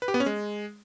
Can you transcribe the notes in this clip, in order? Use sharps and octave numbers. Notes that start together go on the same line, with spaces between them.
B4
G4
B3
C#4
G#3